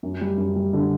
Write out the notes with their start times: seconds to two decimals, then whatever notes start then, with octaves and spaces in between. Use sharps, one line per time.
0.03 F#2
0.21 G3
0.38 F#2
0.56 G3
0.73 D3